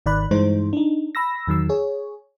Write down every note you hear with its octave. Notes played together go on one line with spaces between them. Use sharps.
G#1 D#3 D5 B5 F#6
G2 E3 G#3 D#4 C5
D4 D#4
B5 E6 A#6
E2 D#3 F#3 E6
G#4 C#5